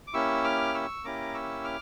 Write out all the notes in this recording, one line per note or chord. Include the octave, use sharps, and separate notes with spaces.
D6
A#3 C#4 E4 G4 C#6 E6
D6 F6
C#6 E6
A#3 C#4 E4 G4 A#5 D6
C#6 E6
D6 F6